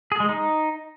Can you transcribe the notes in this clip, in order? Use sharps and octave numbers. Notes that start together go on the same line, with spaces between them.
G#4
G#3
D#4